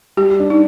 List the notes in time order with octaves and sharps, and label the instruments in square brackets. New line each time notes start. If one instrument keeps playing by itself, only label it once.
[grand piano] G3 [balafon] G4
[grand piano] D4
[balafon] D#4